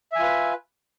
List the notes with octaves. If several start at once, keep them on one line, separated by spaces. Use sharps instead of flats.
F4 B4 E5 G#5